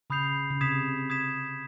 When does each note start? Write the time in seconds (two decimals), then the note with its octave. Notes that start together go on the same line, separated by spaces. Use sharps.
0.10 C#3 B5 D#6 G6 C7 F7
0.50 C#3
0.61 C3 D#6 G#6 B6 E7
1.10 D#6 G#6 B6 E7